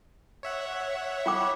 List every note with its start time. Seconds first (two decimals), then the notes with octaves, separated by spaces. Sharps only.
0.43 C#5 E5 F#5
1.26 F4 G5 D6